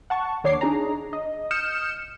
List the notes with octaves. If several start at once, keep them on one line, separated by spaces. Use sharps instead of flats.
F#5 A5 C#6
D#2 D4 C#5 D6 C7
D4 D#4 G#4 A#5
D#5
D#6 F6 G6 C#7 E7